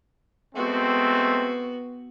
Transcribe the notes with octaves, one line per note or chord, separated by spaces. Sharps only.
G#3 A3 B3 C4 F#4